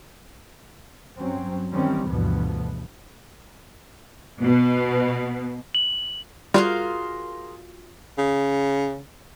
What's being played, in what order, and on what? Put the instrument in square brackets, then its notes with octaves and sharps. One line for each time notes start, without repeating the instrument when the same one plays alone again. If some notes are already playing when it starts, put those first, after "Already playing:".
[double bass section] G2 F#3 C4 C#4
D#3 E3 G3 C4 C#4
D2 G2 B2 E3 F3 B3
[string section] B2
[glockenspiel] F#7
[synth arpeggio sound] G3 [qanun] F4 F#4 F5 [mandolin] G#4 A#4 C5
[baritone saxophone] C#3